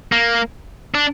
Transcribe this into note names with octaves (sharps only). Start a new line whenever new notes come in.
A#3
D4